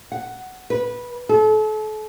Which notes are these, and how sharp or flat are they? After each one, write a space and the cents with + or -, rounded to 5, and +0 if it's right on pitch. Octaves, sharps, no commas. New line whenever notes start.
F#5 +5
B4 -15
A4 -35